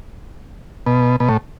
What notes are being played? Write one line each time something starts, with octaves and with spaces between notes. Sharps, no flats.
B2
B2
A2